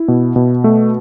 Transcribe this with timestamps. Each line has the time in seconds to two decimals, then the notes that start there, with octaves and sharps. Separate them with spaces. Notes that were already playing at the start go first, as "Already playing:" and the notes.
Already playing: E4
0.08 B2
0.36 B2
0.64 A3